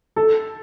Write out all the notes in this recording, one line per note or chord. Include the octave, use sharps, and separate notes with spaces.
A4